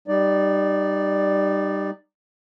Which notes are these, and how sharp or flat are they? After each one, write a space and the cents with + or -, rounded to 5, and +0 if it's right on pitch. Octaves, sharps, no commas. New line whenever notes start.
G3 +0 D#4 -25 D5 +0